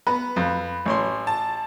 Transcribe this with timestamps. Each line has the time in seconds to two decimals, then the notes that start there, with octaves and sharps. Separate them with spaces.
0.07 B3 B4
0.36 F2
0.85 A1 C#5 C6
1.27 A5